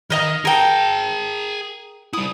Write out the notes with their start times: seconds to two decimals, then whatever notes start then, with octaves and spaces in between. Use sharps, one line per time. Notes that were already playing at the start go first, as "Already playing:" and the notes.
0.10 D#3 A#4 D#5 F5
0.45 G#4 A#4 G5 A5
2.13 G3 E4 D#6